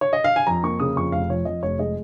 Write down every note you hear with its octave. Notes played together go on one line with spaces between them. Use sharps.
C#5
D#5
F5
G#5
F2 A#5
A#3 C#6
C#3 D#6
F2 C#6
F1 F5
F3 C#5
F2 D#5
F1 C#5
G#3 D#5